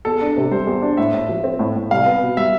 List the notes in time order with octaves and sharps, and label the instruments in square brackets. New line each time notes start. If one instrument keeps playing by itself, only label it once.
[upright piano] E2 [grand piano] A4
[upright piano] D4
C3
[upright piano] G3 [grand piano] C5
[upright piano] E2
D4
[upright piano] A2 [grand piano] E5
[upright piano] A2
F3
C4
A2
A2
[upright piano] C2 [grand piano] F5
[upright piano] B3
B2
[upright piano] G3 [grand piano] E5